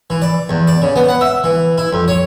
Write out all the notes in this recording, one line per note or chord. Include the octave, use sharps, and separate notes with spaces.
E3
D5
E2
D5
C#3
B3
F#5
E5
E3
E4
F2
C#5